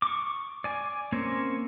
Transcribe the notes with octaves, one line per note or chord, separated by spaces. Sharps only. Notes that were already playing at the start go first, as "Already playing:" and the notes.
C#6 D6
D5 G#5
A#3 C4 C#4 C#5